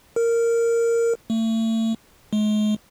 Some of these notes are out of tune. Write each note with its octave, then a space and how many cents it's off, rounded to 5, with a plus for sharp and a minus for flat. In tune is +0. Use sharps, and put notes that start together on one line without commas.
A#4 -10
A3 +35
G#3 +40